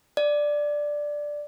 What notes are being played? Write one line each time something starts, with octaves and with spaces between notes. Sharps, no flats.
D5